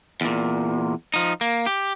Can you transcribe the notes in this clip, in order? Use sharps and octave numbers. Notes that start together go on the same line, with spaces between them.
E2 A#2
F3 D#4
A#3
G4